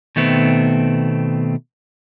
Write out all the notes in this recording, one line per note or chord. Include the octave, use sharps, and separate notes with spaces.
B2 D#3 A3 B3 C4